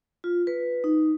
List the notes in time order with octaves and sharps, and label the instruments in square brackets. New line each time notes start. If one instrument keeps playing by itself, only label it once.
[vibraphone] F4
B4
D#4